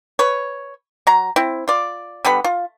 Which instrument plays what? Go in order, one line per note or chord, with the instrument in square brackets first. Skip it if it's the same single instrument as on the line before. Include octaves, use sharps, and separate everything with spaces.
[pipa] B4 C#5
F#3 A#5
C4 E4
F4 D5
D3 G3 B3 B5
F4